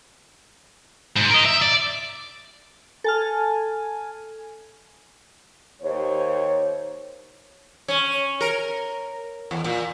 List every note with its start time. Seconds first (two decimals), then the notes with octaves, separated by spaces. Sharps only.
1.16 G#2
1.30 A#4 D#5
1.45 E5
1.62 D5
3.04 A4 G#5 A5 F6
5.82 D#2 C5 C#5
7.88 C#4
8.41 A#4
9.51 E2
9.64 A#2